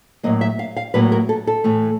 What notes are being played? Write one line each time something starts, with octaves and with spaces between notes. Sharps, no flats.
A2 F#3 A#3 D#5
E5
F5
F5
A2 F#3 A#3 B4
A#4
A4
A4
A2 E3 A3